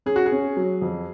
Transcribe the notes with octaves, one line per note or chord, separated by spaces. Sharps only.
C#4 G#4
F#4
G#4
C#4
F#3
F2